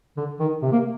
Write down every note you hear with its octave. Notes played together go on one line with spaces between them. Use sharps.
D3
D#3
C3
A#3